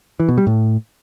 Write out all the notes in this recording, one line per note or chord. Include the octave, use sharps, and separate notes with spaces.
E3
B2
G3
A2